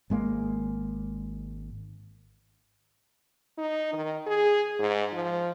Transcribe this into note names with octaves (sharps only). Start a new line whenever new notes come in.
G#1 G#3 A#3
D#4
D#3
G#4
G#2
F3